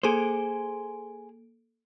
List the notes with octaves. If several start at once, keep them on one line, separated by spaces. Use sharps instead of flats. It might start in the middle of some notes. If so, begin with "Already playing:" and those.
A#3 G#4 A4 C5 D7